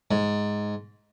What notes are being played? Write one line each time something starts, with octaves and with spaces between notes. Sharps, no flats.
G#2